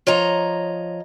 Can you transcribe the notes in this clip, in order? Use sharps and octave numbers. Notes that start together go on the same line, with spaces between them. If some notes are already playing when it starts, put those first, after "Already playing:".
F3 C#5 D#5 A#5